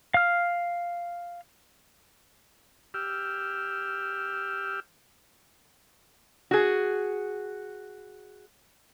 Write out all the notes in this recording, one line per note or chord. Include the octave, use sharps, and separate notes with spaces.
F5 F6
G4 E6 F6
F#4 G#4